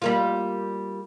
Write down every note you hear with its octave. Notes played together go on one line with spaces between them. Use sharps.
G3 A#3 F4